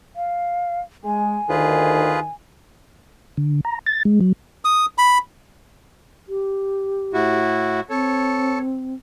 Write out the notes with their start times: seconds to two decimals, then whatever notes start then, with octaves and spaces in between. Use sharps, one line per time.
0.16 F5
1.04 G#3 G#5
1.49 D2 D#3 F4 G#4 B4
3.37 D3
3.65 A#5
3.86 A6
4.05 G#3
4.21 F#3
4.65 D#6
4.98 B5
6.28 G4
7.13 A2 E4 F#4
7.90 C4 A4 C#5